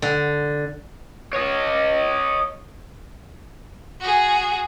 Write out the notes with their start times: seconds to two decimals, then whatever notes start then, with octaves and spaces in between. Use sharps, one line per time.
0.02 D3
1.33 C#5 D#5
4.01 F#4 G#4